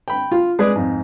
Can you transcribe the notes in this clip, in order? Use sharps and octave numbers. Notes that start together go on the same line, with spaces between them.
G5 B5
F4
G#3 G#4 B4 D5
F2 G#2